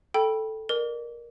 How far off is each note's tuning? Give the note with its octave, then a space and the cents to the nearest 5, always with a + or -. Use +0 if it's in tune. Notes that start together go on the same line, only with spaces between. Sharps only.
A4 +0 G5 +0 B5 -20
A#4 +20 D5 +45 D6 -35